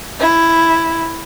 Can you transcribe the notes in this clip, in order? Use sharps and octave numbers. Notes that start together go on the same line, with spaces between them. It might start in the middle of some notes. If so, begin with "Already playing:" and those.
E4